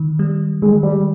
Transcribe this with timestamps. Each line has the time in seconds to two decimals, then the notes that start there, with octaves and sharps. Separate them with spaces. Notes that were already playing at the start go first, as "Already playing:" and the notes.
Already playing: D#3
0.19 G3
0.62 D#3 G#3
0.83 G3